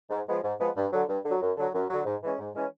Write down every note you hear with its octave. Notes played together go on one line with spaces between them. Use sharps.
G#2
F3 G#3 B3
G#2
F3 G#3 B3
G2
D3 F#3
G2
D3 F#3
F#2
D3 F#3
F#2
D3 F#3
G#2
E3 G#3 C#4
G#2
E3 G#3 C#4